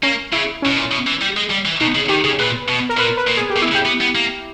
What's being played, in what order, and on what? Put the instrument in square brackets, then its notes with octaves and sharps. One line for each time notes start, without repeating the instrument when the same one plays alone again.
[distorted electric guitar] A#3 [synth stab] C#4
[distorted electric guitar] C#3 [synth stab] E4
[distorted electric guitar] B2 [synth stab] C#4
[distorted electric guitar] A#2
B2
E3
G3
G#3
G3
E3
[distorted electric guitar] B2 [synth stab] D#4
[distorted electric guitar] C#3
[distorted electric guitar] D#3 [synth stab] G4
[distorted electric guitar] C#3 [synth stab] G#4
[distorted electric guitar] A#2 [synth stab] B4
[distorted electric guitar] B2
[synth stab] A#4
[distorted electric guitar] A#2 [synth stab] B4
[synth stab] B4
[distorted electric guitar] A#2
[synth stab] G#4
G4
[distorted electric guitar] B2
[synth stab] E4
[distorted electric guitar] C#3
[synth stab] G4
[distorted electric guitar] B3
B3
A#3